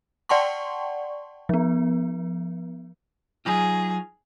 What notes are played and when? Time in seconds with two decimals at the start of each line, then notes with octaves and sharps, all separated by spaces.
0.29 D5 F#5 G5 A5 C6 C#6
1.49 F3 B3
3.45 F#3 D#4 F4 G#4